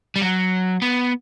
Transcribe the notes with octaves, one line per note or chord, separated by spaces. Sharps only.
G3
F#3
B3